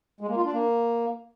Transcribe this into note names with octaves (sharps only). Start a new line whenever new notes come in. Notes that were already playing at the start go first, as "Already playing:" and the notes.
G#3
A#3
F4
D4
A#3